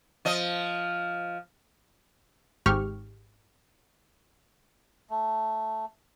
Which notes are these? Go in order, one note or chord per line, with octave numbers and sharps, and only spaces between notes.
F3 D#5
G#1 G#2 G4 C#6 F6
A3